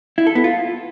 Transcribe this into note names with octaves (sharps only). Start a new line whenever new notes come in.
E4
A4
B3
F4